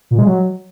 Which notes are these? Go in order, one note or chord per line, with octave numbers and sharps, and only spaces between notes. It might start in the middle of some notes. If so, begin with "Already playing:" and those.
A#2
G#3
F#3